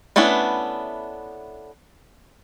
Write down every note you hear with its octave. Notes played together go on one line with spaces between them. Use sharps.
A3 B3 C#4 D4 E4